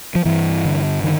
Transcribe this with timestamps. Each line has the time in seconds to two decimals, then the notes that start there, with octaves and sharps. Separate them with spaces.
0.15 F3
0.25 G2 E3
0.65 D3
1.04 D3 D#3